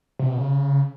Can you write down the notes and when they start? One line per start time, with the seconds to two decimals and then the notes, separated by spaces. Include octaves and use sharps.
0.19 C3
0.29 B2
0.38 C#3